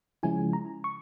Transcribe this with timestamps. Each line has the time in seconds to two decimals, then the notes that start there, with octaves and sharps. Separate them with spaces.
0.23 C#3 F3 G#3 C#4 E4 G#5
0.53 A#5
0.84 C#6